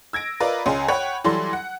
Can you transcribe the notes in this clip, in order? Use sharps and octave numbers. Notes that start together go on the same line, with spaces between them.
E6 G#6 A#6 D7
F4 A#4 B4 D5 D#5 B5
C#2 C#4 G#4 C6 D#7
C#5 F#5 G5 B5
E3 F#3 G3 A4 C6
F#5